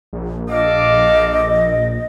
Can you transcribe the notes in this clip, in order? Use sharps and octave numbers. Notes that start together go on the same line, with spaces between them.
A#1
A4 D#5 F5 D6